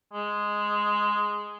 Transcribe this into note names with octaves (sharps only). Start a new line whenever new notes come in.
G#3